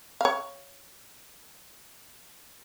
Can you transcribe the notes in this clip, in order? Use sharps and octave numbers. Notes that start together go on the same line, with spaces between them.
C#5 F5